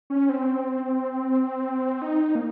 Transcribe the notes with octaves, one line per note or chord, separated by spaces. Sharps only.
C#4
C4
D#4
A#3